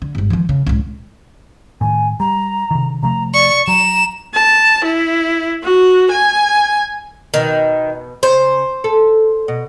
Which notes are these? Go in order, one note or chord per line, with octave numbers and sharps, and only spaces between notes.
D3
G1 G#2
D#3 F3
C#3
C#2 A2
A2 D#3 G#5
G3 A#5
C3 D#3
C3 F3 A3 A#5
D5 C#6
F#3 A#5 E7
A5
E4
F#4
G#5
B2 D#3
C#3 C5
A4
B2